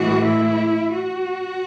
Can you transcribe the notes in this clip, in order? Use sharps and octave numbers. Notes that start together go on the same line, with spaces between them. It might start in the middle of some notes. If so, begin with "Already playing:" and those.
Already playing: A2 E3 G#3 F#4
E4
F#4